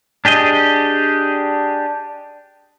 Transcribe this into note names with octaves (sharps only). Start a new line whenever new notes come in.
D4 G4 G#4 D#5